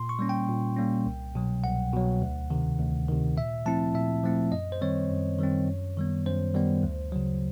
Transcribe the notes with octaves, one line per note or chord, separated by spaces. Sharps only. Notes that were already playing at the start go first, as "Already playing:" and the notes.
Already playing: A#2 C6
C#6
G3 A#3 C#4
G5
A#2
G3 A#3 C#4
C2
B2 F#3
C2 F#5
B2 F#3
D2
C3 D#3
D2
C3 D#3
A#2 E5
F3 A3 C4 E4 A5
A#2 E5
F3 A3 C4 E4
F#2 D#5
C5
D#3 G3 C4 C#5
F#2
D#3 G3 C4
F#2
D#3 G3 B3
F#2 C5
D#3 G3 B3
D2
C#3 F#3